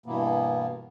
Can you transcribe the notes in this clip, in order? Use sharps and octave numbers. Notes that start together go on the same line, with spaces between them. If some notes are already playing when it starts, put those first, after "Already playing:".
G2 B2 E3 A#3 B3